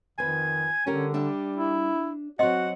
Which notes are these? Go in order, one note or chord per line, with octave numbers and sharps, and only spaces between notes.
F2 D#3 B4 G#5
D3 G3 C#4 G4 A#4
G3 D4 E5
E4
F#3 C4 F#4 D#5 F#5 C6